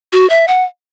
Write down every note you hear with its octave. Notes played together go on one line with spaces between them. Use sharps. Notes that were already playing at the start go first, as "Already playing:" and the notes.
F#4
E5
F#5